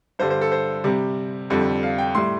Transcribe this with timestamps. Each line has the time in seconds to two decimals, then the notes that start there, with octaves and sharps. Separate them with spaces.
0.19 G2 D3 G3 C5
0.30 C5
0.41 A4
0.52 C5
0.84 C3 G3
1.50 F2 D3 G3
1.83 F5
1.98 G5
2.15 A2 G3 C6